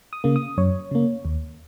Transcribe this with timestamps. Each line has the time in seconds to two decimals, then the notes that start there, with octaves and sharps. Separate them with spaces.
0.13 D#6
0.24 C#3 A#3
0.36 D#6
0.58 F#2 C#5
0.91 C#3 A#3
1.25 D#2